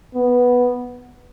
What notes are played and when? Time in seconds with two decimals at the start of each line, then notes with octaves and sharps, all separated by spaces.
0.15 B3